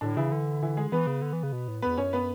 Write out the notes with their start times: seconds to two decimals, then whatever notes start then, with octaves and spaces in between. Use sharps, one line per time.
0.01 A2 D3 D4
0.17 C#3 E3 E4
0.32 D3
0.62 E3 E4
0.77 G#3 G#4
0.92 E3 B3 B4
1.07 C#3
1.22 D3
1.33 E3
1.43 C#3
1.53 B2
1.68 A2
1.82 E2 B3 B4
1.98 F#2 C#4 C#5
2.13 B3 B4